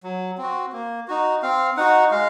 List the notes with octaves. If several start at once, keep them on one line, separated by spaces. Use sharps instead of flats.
F#3
C4 F#4
A#3
D#4 F#4
C4 F5
D#4 F#4 F#5
G#3 F5